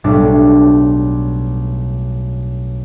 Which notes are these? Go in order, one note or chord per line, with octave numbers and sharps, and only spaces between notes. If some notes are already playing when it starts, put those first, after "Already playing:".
B1 A2 G3 D4